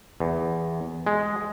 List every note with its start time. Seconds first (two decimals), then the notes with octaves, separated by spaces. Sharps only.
0.20 E2
1.07 G#3